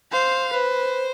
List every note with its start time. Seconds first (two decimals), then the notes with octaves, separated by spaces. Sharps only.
0.11 C5 F5
0.53 B4 C5